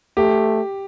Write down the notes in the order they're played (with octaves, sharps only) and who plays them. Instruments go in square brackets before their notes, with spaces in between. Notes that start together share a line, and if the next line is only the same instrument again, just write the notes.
[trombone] A3 [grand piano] G4